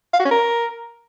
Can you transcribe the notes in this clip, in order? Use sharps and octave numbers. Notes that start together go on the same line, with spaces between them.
F5
F#4
C#4
A#4